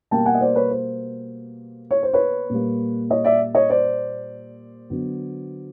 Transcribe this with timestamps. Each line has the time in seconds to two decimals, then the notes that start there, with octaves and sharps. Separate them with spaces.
0.11 B2 G3 A#3 G5 A5
0.26 F#5 G#5
0.35 D#5
0.40 C5 D5
0.55 B4 C#5
0.71 C5
1.91 C#5
2.03 C5
2.13 B4 C#5
2.50 A#2 G3 A#3
3.10 C#5 D#5
3.24 D5 E5
3.55 C#5 D#5
3.69 C5 D5
4.90 D3 F#3 B3